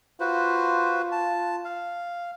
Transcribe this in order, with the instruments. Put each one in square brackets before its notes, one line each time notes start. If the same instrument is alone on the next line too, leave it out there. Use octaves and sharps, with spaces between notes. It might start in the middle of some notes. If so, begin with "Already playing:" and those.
[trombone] F4 [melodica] F#4 B4 C5
[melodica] A5
F5